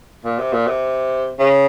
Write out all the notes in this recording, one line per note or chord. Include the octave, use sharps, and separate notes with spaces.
A#2
C3
A#2
C3
C#3